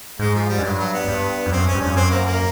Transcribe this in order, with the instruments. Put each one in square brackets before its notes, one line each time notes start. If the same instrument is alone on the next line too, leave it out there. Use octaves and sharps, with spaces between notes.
[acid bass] G#2 [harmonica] G#3
[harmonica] F3
G3
[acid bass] F#2
[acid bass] G2 [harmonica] F#3
[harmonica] F#3
B3
[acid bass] G2
F2
[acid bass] F#2 [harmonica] C4
[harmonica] C#4
[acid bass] G2
[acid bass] F2 [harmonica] C#4
[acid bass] F#2 [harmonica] C4
[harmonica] A#3
A#3